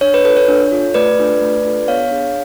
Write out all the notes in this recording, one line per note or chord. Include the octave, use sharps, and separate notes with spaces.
D4 C#5
B4
F4 A4 B4
C#5
D4
F4 A4
A3 B4 D5
D4 F4 A4
A3
D4 F4 A4
B3 C#5 F5
D4 G#4